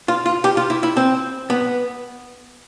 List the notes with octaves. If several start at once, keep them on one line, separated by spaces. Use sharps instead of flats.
F4
F4
G4
F4
E4
E4
C4
B3